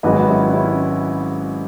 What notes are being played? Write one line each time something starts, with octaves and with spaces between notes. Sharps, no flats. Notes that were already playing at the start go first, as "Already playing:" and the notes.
G#1 G#2 F#3 B4 D#5
C#4 E4
C#4 E4